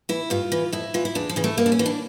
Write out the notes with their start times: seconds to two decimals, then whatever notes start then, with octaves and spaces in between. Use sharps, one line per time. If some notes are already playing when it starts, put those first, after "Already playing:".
0.09 E3 E4
0.30 G2 F4
0.52 E3
0.72 F2 E4
0.94 E3 F4
1.05 E4
1.15 E2 D4
1.29 F3
1.36 C#3 E3
1.44 A3
1.57 G2 A#3
1.66 D4
1.72 C#4
1.79 E3
1.86 D4